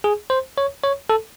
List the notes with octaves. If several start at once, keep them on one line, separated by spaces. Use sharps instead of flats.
G#4
C5
C#5
C#5
A4